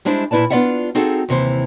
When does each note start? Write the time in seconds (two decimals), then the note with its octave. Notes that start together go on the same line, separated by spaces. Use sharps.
0.05 G3 G#3 D4 E4 C5
0.31 A#2 E4 B4 D5 A5
0.50 B3 D4 F4 D5 E5 F#5
0.95 C4 D#4 F#4 G#4 A4
1.29 D#2 C3 E3 C5